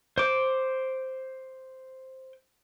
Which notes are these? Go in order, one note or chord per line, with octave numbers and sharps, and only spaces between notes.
C5 D6